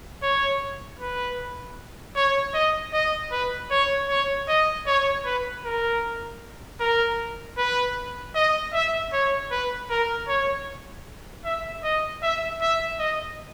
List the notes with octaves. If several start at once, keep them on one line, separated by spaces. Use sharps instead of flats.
C#5
B4
C#5
D#5
D#5
B4
C#5
C#5
D#5
C#5
B4
A#4
A#4
B4
D#5
E5
C#5
B4
A#4
C#5
E5
D#5
E5
E5
D#5